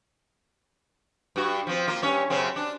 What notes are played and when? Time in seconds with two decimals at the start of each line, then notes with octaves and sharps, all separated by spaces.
1.36 G2 F#4
1.67 F3 C4
1.87 A#3 F4
2.02 G2 C#4 C#5
2.30 F#2 C#3 C4
2.56 D4